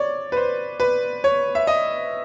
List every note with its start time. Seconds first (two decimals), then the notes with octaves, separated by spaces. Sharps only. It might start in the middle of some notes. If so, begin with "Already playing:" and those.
Already playing: C#5 D5
0.32 B4
0.37 C5
0.80 B4
1.24 C#5
1.55 E5
1.67 D#5